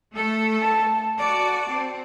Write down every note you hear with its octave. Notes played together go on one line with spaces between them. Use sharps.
A3 A4
A5
F#4 D5 A5
C4